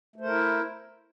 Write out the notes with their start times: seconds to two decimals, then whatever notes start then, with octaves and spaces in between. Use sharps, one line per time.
0.16 A3
0.20 C5
0.25 A#4
0.29 E4